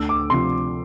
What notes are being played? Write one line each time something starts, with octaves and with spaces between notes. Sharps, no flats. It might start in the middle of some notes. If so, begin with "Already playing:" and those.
Already playing: D2 E6
D6
C3 F3 C6